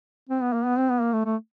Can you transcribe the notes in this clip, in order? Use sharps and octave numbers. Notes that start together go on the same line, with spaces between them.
C4
B3
A#3
B3
C4
B3
A#3
A3
A3